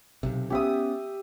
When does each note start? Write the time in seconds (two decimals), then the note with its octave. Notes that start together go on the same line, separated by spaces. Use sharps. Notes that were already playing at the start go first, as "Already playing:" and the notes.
0.23 B1 C3
0.50 B3 C#4 G4 E5 D#6